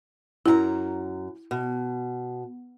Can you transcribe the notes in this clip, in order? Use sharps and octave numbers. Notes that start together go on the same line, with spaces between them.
F#2 E4 G#4 A#5
B2